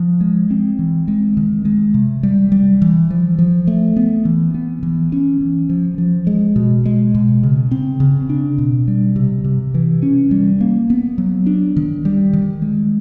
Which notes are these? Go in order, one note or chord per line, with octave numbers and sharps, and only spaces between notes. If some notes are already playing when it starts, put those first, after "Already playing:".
Already playing: F3
G#3
C4
E3
G#3
D#3
G#3
C3
G3
G3
E3
F3
F3
A3
B3
E3
B3
E3
C#4
E3
F3
F3
G#3
B2
G#3
B2
C#3
C4
C#3
D4
B2
G3
C3
C3
E3
C#4
G3
A#3
B3
F#3
D4
D#3
G3
D#3
G#3